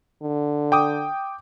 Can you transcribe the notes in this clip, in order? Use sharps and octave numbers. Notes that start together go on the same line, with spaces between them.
D3
G5 D6 D#6